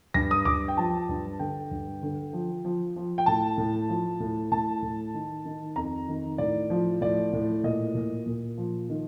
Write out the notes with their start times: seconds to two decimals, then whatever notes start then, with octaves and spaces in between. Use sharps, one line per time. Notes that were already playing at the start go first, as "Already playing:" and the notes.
0.14 G2 A#6
0.31 D#6
0.45 G2 D6
0.68 G5
0.77 F3 A5
1.09 G2
1.39 D3 G5
1.71 G2
2.03 D3
2.33 F3
2.65 F3
2.96 F3
3.18 G5
3.26 A2 A5
3.58 A2
3.89 F3
4.20 A2
4.52 A2 A5
4.82 A2
5.14 D#3
5.45 D#3
5.76 F2 A#5
6.08 D#3
6.38 A2 D5
6.70 F3
7.01 A2 D5
7.33 A2
7.64 A#2 D#5
7.95 A#2
8.26 A#2
8.58 F3
8.89 D#3